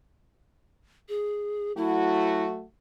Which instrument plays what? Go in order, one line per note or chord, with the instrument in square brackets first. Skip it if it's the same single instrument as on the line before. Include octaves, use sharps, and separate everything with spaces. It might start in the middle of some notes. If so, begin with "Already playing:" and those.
[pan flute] G#4
[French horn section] F#3 A3 F#4 [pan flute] E4